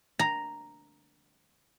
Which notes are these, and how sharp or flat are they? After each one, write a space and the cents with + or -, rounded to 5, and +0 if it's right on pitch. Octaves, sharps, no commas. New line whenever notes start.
A#5 +0